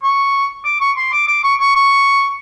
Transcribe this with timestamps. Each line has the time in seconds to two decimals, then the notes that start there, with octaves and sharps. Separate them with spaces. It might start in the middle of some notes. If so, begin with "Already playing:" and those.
0.03 C#6
0.64 D6
0.80 C#6
0.97 C6
1.12 D6
1.27 D6
1.43 C#6
1.60 C#6
1.75 C#6